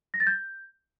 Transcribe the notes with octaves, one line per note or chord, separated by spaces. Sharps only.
A#6
A6
G6